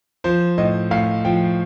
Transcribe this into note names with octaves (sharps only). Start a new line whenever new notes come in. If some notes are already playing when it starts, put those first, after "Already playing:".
F3 C5
A2 D#5
A2 F5
F3 G5